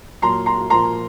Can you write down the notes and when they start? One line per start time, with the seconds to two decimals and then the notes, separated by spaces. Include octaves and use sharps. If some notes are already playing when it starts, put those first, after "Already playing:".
0.22 A#2 F#3 A#3 A#5 C6
0.46 A#5 C6
0.70 A#2 F3 A#3 A#5 C6